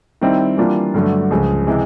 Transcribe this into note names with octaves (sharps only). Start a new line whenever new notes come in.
D#3 G3 C4 E4
E3 G3 A#3 D4 F4
G2 D3 F#3 A3
C#2 C#3 F3
C3 E3 G#3